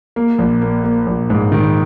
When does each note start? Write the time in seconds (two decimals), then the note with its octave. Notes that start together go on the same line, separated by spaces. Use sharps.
0.16 A#3
0.38 A#1
0.62 A#3
0.84 A#3
1.07 A#1
1.30 G#2
1.52 D#3